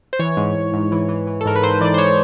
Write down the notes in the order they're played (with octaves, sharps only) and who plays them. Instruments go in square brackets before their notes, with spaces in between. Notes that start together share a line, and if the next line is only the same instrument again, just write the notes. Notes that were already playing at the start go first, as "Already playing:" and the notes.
[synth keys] C5
E3 C#5
G#2
G#2
G#2
E3
E3
E3
A4
G#2 A#4
B4
G#2 C5
E3 D5
C5
E3 C#5